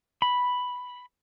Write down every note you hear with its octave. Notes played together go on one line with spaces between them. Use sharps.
B5